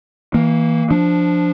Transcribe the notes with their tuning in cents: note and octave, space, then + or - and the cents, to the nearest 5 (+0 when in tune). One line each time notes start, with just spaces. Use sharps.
E3 -25 A#3 +0
F3 +0 D4 +0